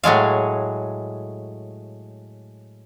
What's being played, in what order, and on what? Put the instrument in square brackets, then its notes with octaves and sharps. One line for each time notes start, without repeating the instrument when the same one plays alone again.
[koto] A2 F#3 G#3 F5